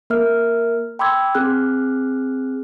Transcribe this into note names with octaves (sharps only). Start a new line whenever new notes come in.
A#3 A#4 E5 F6
G5 B5 C6 D6 E6 G#6
C4 G#4 F6 F#6